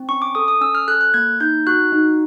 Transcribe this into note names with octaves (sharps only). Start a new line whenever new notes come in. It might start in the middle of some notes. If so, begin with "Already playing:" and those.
Already playing: C4
C#4 C#6
D6
A4 D#6
D#6
C#4 E6
F6
A4 F#6
F#6
A#3 G#6
D#4 G6
F#4 F#6
D#4